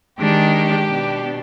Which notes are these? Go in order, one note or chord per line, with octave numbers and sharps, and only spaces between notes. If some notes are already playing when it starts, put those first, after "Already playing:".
D#3 G#3 D4 G4
B2 B3 D4